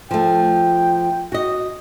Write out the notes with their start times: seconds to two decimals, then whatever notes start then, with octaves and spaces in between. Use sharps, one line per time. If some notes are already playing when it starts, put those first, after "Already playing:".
0.11 F3 A3 G5
1.32 F#4 D#5